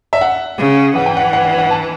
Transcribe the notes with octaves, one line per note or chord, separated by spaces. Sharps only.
E5
F#5
C#3
E3 F#5
G5
F#5
F#5
F#5
F#5
A5